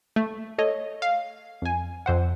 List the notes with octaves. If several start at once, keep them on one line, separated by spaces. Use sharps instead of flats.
A3
A4 C#5 D#5
F5
F2 G#5
F2 C5 F#5